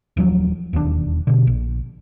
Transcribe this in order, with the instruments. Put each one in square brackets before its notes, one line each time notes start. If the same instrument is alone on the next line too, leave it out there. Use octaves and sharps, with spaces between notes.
[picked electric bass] D#1 F3 F#3
E1 D#2 G#2 D4
B2 D3
A#1